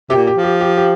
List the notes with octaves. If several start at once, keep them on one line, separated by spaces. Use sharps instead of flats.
C3 G4
A#2
G4
F3
G4
G4
G4